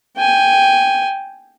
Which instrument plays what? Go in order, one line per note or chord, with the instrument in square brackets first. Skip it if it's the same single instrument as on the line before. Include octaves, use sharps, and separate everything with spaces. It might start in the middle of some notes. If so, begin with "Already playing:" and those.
[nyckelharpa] G5 G#5